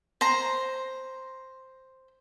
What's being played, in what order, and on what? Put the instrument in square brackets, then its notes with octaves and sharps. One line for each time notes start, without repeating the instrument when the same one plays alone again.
[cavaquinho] C5 A#5